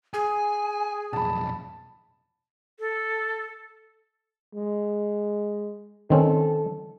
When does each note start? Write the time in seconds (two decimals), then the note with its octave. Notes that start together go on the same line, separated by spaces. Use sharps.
0.14 G#4 G#5
1.13 B1 F2 A5 B5
2.80 A4
4.55 G#3
6.10 D#3 C4 C#4 A4